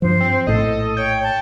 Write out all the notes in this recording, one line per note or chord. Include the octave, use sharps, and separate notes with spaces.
G2 F3 C5
C4
A#1 A2 A4 D#5
C#5 G5
A5